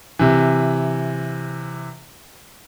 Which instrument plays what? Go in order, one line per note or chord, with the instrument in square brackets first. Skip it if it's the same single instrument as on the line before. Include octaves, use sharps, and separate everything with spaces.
[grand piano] C3 E3